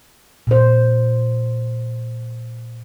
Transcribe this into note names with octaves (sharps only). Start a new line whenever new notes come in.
A#2 C5